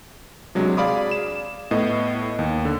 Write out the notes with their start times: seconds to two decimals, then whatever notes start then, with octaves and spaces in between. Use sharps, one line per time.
0.55 C3 F#3 G#3 D4
0.77 G#4 D5 F5 B5 D6 D#6
1.11 E7
1.71 A2 B3 A4 D#5
2.39 D#2
2.65 D3